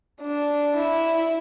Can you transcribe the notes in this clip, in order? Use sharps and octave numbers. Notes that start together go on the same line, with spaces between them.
D4
E4